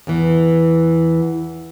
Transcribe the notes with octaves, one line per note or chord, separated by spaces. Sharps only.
E2 E3